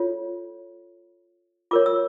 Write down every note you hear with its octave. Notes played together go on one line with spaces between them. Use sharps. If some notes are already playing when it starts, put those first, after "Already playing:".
Already playing: F4 A4 C#5
F4 A#4 C#5 D6
E6